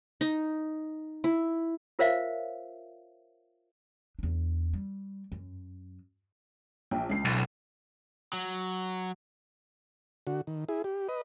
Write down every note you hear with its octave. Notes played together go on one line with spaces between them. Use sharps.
D#4
E4
F4 A#4 C5 C#5 E5 F5
E2 D4
G3
F#2
A#1 G5
C#2 C7
B1
F#3
D3 F#4
D#3
E4 G#4
G4
B4 D#5